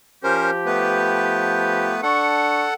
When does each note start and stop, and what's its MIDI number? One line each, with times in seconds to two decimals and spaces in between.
0.24 1.96 53
0.24 0.50 61
0.24 1.96 67
0.24 0.50 70
0.24 0.50 72
0.66 2.01 57
0.66 2.01 59
0.66 2.01 71
2.03 2.65 62
2.03 2.74 69
2.03 2.74 78
2.03 2.65 85